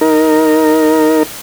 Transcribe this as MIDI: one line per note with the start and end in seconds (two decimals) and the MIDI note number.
0.01 1.23 63
0.01 1.23 70